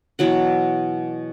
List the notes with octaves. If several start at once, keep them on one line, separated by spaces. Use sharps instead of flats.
B2 E3 F#3 F#5